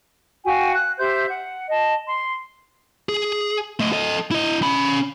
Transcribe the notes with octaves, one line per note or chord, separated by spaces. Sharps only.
F#4 F5 G5 G#5
F#6
G4 C5 E5 G6
F#5
D#5 A5
C6
G#4
A3 D#5
A4 D#5
E4 D#5
C#4 B5